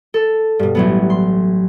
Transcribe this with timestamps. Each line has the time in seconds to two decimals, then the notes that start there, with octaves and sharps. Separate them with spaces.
0.14 A4
0.59 G2 B2
0.75 A1 F#3 B3
1.10 C6